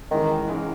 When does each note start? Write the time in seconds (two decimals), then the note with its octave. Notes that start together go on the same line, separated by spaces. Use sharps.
0.11 G#2 D#3 E3 G#3 C#4
0.47 G#2 E3 G#3 C#4